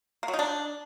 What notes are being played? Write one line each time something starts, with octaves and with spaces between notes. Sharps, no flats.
A#3
F#3
D#4
D4